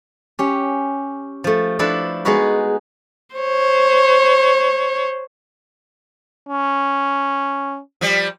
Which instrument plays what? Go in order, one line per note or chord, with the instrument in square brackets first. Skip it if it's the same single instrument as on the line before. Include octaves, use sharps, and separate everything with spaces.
[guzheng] C#4 G4
F3 A3
F3 D4 E4 A4 B4
G#3 B3 D#4 F#4 B4
[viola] C5 C#5
[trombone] C#4
[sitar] F3 G3